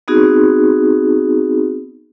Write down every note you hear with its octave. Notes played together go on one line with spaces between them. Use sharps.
B3 C4 D#4 F#4 G#4